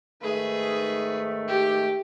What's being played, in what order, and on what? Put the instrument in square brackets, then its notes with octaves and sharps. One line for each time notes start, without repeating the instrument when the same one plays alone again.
[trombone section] G#2 D#3 A3 [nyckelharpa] G#4 B4
[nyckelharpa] G4